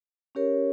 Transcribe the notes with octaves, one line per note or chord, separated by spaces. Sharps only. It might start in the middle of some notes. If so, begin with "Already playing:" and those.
C#4 G4 A#4 C#5